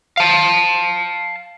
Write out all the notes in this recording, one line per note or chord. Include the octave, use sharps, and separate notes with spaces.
F5 A5